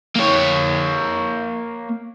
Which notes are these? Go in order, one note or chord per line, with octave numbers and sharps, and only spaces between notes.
A#3 C#5